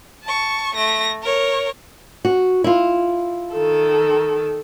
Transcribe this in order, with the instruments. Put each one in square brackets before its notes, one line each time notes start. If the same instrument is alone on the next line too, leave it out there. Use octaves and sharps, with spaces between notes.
[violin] A5 C#6
A3 A#6
A#4 C#5
[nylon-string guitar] F#4
E4 F4
[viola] D#3 A4